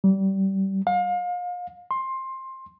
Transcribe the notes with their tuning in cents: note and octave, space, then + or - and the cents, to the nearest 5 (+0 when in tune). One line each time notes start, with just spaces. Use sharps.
G3 -25
F5 +35
C6 +15